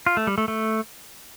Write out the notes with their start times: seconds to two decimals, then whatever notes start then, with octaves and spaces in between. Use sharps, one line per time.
0.07 F4
0.17 A3
0.27 G3
0.38 A3
0.48 A3